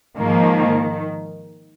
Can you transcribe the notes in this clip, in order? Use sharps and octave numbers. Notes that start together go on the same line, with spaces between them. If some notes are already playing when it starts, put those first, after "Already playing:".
G#2 D#3 F3 A#3